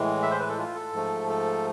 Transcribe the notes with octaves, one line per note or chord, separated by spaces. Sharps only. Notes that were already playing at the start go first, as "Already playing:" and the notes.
Already playing: A2 E3 G#3
E5
C5
B4
A4
F4
A4
G#2 F3 A3
A4